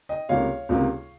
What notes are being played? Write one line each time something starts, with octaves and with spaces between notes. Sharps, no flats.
D#5 G5
C#2 C3 G3 A#3 C#5 F5
C#2 C3 G3 A#3